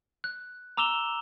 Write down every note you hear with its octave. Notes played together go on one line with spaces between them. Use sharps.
F#6
A#5 D6 E6 E7 F7 G7